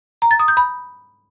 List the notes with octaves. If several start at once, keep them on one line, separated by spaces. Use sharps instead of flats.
A#5
A6
D#6
G6
B5